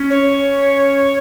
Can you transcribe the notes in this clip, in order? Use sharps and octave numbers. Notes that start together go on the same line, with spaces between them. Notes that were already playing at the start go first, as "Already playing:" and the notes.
Already playing: C#4
C#5